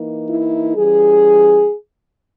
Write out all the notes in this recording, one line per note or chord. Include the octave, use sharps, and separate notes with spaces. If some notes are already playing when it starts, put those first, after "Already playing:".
Already playing: E3 A#3 D#4
E4
E3 G3 C#4 G#4